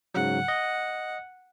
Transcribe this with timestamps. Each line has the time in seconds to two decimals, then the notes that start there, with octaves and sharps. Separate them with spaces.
0.14 G#2 C#3 F#3 F#5
0.48 D#5